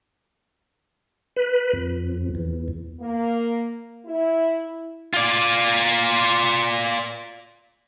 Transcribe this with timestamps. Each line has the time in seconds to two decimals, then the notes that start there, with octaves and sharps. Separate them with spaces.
1.36 B4
1.73 F2
2.35 E2
3.00 A#3
4.06 E4
5.14 F4 D5